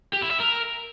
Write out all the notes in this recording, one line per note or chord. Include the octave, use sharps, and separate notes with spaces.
G4
E4
E5
A#4